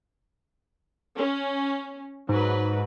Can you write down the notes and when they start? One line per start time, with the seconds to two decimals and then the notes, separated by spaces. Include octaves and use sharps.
1.17 C#4
2.29 G#2 F#3 B4